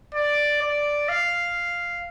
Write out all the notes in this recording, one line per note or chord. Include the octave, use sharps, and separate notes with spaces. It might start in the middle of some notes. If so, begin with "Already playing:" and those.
D5
D5
F5